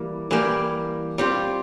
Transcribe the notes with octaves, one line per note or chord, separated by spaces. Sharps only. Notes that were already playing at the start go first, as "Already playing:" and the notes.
Already playing: E3 G3 A#3
E3 G3 A#3
G3 C4 F4